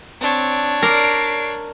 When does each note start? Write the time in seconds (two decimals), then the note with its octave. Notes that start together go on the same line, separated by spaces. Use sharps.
0.21 C4 D4 C#5
0.82 A#4 D5 C7 D7